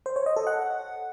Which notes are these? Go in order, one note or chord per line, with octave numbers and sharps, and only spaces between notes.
C5
C#5
D#5
A4
F#5